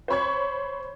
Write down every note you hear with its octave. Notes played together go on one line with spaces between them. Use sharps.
C5 C#5 B5 C#6 G#6